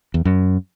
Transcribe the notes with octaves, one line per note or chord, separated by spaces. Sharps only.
E2
F#2